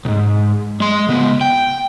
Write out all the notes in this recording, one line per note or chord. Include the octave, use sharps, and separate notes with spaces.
C2 G#2
G#3 C6
C#3 B3
G5